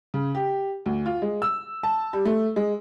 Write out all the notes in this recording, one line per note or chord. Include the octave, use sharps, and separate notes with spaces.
C#3
G4
D2
F4
G#3
E6
A5
G3
A3
G#3